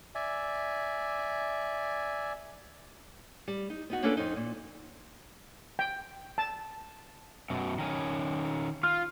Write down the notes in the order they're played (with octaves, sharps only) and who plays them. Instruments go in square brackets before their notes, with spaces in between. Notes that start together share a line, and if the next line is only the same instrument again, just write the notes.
[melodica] D5 E5 G#5
[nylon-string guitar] G3
D#4
B3 D#4 F#4
A#3 C#4 D4 F4 A4 B4
F2 D#4
A#2
[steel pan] G5
A5
[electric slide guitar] F#2 B2
D#3 C#4
[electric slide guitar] F4 [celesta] F6